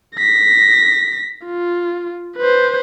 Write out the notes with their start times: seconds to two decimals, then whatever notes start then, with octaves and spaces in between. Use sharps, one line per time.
0.16 A#6 B6
1.46 F4
2.37 B4 C5